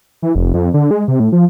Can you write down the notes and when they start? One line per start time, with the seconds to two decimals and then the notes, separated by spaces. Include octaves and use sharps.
0.22 E3
0.35 F1
0.54 F2
0.74 D3
0.91 G#3
1.08 C3
1.20 A2
1.32 F3